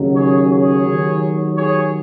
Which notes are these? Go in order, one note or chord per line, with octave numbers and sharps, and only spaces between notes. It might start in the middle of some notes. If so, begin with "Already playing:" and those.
Already playing: D#2 C#3 F#3
G#4 C#5
G#4 C#5
D#2 D#3 F#3
G#4 C#5